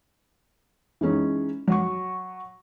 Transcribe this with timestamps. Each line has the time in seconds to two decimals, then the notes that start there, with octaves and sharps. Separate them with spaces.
1.01 E3 G#3 C#4 D#4
1.68 F#3 C#6